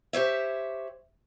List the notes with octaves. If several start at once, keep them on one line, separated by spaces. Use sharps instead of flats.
G4 C5 C#5 E5